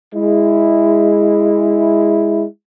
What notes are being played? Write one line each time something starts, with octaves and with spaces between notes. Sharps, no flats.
G#3 E4